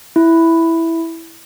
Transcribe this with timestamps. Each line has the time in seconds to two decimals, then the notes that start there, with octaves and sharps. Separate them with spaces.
0.16 E4